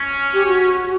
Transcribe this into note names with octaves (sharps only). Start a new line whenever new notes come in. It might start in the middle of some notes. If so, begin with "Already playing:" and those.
Already playing: C#4
G4
F#4